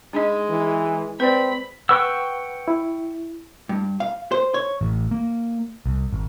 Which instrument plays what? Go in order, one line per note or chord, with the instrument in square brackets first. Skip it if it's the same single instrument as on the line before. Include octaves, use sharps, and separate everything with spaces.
[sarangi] G#3 [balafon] D4 D#4 D#5
[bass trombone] E3
[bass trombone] C4 [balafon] B4 D5 [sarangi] B5
[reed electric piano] B4 F#5 [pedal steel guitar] G5 C#6 E6
[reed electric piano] E4
[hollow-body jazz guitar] G2
F5
C5
C#5
[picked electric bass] A1
A#3
C2
G#1